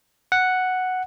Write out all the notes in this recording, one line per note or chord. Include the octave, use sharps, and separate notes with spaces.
F#5